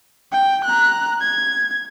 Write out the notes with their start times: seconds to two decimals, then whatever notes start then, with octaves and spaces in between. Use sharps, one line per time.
0.32 G5
0.65 A#5 F#6
1.21 G#6